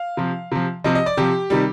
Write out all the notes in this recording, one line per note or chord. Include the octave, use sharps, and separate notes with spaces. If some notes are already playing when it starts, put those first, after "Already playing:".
Already playing: F5
C3 F3
C3 F3
C3 F3 D#5
D#5
D5
C3 F3 G4
C3 D#3 G3